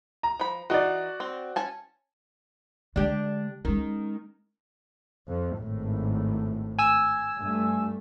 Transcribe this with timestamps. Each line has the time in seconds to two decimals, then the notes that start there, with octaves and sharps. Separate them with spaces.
0.23 A#5
0.40 F3 B5
0.70 E3 D#4 F#4 D5
1.20 C4
1.56 C#4 G#5 A5
2.96 D3 G#3 D4 G4
3.65 D#3 G#3 C#4
5.28 F2
5.59 G#1 A2
6.79 G#5 E6
7.39 G2 A3